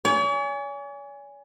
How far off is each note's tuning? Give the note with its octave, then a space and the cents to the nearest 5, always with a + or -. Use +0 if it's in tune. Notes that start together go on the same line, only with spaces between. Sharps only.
C#5 +45 G#5 -10